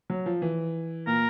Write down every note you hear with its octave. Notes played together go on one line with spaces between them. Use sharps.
F#3
F3
E3
A#2 A#4